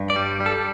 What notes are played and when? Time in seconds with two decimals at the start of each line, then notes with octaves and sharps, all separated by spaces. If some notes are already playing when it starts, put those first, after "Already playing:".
Already playing: G2
0.10 D5
0.16 G3
0.40 G3
0.46 A4